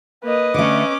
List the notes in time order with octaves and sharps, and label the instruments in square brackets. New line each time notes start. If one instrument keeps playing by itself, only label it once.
[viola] A#3 [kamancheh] B4 D#5
[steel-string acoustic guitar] D3 A3 [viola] C#4 D6